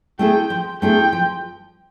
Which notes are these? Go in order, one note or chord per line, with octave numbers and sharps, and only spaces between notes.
A3 C4 E4 G#4 G5
F3
A3 C4 E4 G#4 G5
F3